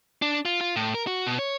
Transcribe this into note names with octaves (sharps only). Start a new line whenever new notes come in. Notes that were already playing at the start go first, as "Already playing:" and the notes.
D4
F4
F4
A2
A#4
F#4
B2
C#5